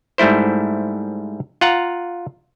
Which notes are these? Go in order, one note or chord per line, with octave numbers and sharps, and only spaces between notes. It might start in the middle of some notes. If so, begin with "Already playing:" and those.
G#2 G3 A3 E4 C5
F4 F#5 A#5